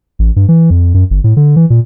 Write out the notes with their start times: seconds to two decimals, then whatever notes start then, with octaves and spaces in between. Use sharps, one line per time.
0.19 A1
0.36 G2
0.49 E3
0.70 F2
0.94 F#2
1.10 G1
1.24 A2
1.37 D3
1.56 E3
1.70 A#2